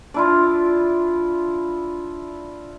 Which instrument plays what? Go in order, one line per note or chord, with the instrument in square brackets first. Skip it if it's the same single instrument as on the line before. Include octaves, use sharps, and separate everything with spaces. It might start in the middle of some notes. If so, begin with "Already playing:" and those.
[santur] D4 E4 F4